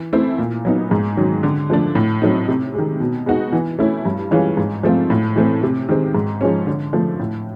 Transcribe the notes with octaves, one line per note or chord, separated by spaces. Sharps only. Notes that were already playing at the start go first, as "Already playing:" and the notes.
Already playing: E3
A3 C4 E4
A#2
F#3 B3 D#4
G#2
D#3 F#3
D3
F3 A3 D4
A2
F#3 A3 C4 D#4
C3
D#3 G#3
B2
G#3 B3 D#4 F#4
E3
A3 C#4 E4
G2
E3 G#3 C#4 F4
G#2
F3 A3 C4 F4
A2
E3 A3 C4
C3
D#3 G#3 C4
G#2
F3 G#3 C#4
D3
F3 A3
A2